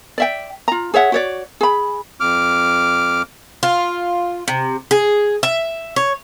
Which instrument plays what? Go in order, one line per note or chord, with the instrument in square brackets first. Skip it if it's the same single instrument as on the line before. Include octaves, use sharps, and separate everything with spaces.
[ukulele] D5 E5 G5
F4 A#5
G#4 C#5 E5 F#5
F#4 C#5 D5
G#4 B5
[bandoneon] F2 D6 F6
[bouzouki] F4
C3
G#4
E5
C#5